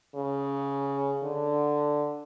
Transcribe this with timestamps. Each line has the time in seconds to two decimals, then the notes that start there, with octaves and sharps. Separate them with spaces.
0.15 C#3
1.23 D3